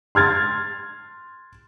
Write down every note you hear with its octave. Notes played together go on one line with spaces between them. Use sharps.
C6 F6 G#6 A6